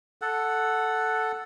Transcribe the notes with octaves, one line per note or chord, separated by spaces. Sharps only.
A4 F#5